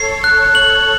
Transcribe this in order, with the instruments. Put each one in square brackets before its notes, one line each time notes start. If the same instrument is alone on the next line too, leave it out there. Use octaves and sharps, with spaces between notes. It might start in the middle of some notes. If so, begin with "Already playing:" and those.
Already playing: [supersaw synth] A4 C#5 [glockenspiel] C7
[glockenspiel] F#6
F#7